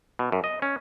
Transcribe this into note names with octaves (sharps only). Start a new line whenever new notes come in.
B2
F#2
D#5
C#4